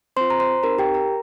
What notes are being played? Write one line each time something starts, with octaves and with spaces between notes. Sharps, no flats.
C4 F4 C5 C6
A#5
C5 C6
C4 D#4 G4 A#4 A#5
G4 G5
A#4 A#5